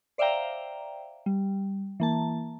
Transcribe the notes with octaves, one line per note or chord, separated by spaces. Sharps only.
C5 D5 E5 F5 G5 A#5
G3
E3 A#3 A5